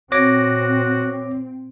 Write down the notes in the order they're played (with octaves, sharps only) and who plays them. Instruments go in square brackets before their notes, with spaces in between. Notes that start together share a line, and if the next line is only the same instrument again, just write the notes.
[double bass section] A#2 C4 [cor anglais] F#4 [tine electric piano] C#5 D6 A#6